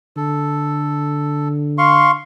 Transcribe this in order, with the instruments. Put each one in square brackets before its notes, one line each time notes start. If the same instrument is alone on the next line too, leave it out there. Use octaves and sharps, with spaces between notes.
[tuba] D3 [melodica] A4
[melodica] F5 C6 C#6